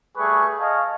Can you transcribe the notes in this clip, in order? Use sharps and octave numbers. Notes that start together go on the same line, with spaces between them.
G3 A3 G#4 B4 C#6
D#5 F5 G#5 A5 C#6